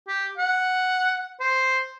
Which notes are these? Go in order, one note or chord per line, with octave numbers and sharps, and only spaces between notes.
G4
F#5
C5